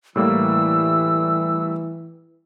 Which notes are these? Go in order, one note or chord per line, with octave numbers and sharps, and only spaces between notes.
A2 E3 G3 A#3 E6